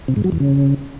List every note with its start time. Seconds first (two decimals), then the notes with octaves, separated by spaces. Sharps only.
0.08 C3
0.16 G#2
0.24 F#3
0.32 E2
0.40 C#3